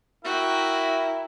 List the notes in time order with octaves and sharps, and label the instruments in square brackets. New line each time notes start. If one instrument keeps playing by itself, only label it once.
[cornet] E4 [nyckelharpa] F#4 G5 [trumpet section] A#4 E5